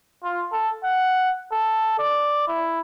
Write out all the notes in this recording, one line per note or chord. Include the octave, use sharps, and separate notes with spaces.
F4
A4
F#5
A4
D5
E4